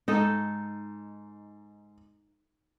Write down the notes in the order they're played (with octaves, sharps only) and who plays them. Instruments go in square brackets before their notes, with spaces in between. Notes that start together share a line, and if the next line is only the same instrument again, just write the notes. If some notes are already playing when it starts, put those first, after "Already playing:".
[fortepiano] G#2 [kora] D#4 A4 D#5